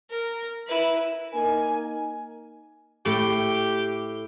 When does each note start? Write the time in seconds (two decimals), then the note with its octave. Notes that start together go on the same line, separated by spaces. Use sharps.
0.10 A#4
0.67 E4 B4
1.33 A#3 D#4 A#4 G#5
3.06 A2 G4